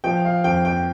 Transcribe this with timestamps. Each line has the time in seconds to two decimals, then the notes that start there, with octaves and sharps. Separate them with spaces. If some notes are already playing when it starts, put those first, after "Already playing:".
0.04 F3 G5
0.25 F5
0.44 F2 G5
0.65 G5